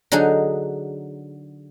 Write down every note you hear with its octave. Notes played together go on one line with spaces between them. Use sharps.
D3 F#3 D#4 G#4